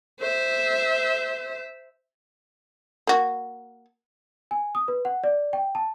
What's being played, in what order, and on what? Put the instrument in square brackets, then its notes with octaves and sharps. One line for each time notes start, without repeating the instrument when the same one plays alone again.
[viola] C5 E5
[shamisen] A#3 F#4
[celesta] G#5
D#6
B4
F#5
D5
G5
A5